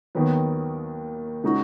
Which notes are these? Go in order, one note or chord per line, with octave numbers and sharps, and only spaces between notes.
D#2 D#3 F#3 B3
C#3 G#3 D#4 F#4